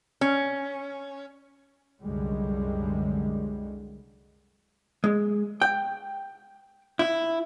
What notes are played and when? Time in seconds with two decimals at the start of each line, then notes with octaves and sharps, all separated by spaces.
0.21 C#4
2.03 C2 F#2 D3 G3 G#3
5.04 G#3
5.62 G5
6.99 E4